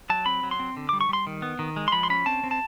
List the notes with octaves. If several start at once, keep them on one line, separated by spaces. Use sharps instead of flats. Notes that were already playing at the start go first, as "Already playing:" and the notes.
F#3 A5
C4 B5
F#3
C6
C4
D3
G3 D6
C#6
G3 C6
D#3
B3
D#3
G#3
C6
F3 B5
C6
C#4 B5
C4 A5
C4
A5